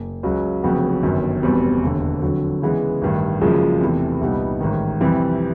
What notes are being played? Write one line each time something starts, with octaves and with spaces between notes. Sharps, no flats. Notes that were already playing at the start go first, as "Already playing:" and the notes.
Already playing: F#1
C#2 C#3 F#3
F1 F2 C#3 F#3 B3
G1 F#2 D#3
F1 E2 B2 G3 C4
E1 D#2 D3
F2 D3 F#3
C#3 E3 G#3 B3
A1 G2 D#3
F#1 F#2 C#3 F3 G#3
E2 C3 E3 A3
C2 A#2 G3 B3 D#4
A1 G#2 D#3
F2 C3 E3 G3 C4